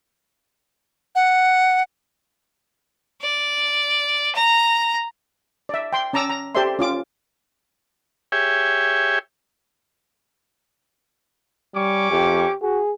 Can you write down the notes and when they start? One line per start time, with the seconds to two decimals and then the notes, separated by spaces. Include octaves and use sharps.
1.15 F#5
3.22 D5
4.35 A#5
5.69 D5 E5
5.93 G5 C6
6.13 C#4 A5 A#5 D6 E6
6.30 A#5
6.55 G4 A4 C5 D5 E5 C6
6.79 C#4 F4 D6
8.32 G4 G#4 C#5 E5 G5 G#5
11.75 G3 C#4 C#6 D6
12.11 F2 G4
12.62 F#4 G#4